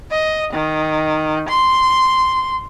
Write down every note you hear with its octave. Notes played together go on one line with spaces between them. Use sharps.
D#5
D#3
C6